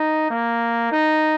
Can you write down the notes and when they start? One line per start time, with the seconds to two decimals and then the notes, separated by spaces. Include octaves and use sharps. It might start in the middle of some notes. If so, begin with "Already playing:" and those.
Already playing: D#4
0.30 A#3
0.92 D#4